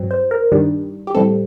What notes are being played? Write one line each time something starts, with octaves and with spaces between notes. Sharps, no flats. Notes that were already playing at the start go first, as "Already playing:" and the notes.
Already playing: G2 F#3 C4
C5
A#4
G2 D#3 G3 D4
G4
A2 G3 C4 A4